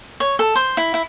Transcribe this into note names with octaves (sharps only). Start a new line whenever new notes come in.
C#5
A4
C5
E4
E4